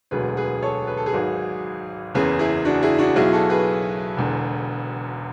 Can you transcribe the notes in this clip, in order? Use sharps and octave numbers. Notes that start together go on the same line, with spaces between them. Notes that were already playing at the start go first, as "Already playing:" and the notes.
E1 D2 D3 F#3 G#4 B4
G#4 B4
A4 C#5
B4
A4
G#4 B4
G#1 G#2 F#3
F#1 E2 C#3 G#4 B4
E4 G#4
D4 F#4
E4 G#4
D4 F#4
B1 B2 F#3 E4 G#4
F#4 A4
G#4 B4
E1 E2 D3